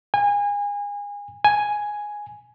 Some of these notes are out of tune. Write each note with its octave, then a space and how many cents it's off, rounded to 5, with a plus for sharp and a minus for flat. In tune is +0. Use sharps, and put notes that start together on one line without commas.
G#5 -30
G#5 +0